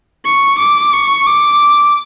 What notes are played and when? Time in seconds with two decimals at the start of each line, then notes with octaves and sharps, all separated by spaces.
0.25 C#6
0.59 D6
0.93 C#6
1.26 D6